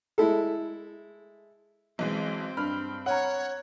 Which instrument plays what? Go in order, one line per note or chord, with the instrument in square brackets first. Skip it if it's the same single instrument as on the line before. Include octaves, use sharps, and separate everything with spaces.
[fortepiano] G#3 E4 A4
[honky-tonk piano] B1 E3 G#3 [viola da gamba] C4
[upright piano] G2 [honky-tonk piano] B5 F6
[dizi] C#5 [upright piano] F#5 A#5